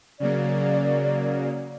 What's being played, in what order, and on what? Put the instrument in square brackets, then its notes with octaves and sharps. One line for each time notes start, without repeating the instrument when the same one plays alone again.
[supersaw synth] C#3 F#3 A#3 [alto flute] D5